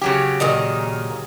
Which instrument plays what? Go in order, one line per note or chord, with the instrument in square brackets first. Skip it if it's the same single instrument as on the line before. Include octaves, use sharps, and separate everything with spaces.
[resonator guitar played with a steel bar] C#3 F#3 G4
[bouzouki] A#2 D#3 D#4